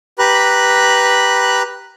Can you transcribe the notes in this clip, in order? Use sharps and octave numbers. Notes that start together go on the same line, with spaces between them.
G4 B4 A#5 B5 F#6